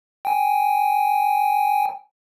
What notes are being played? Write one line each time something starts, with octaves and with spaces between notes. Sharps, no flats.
G5 G#5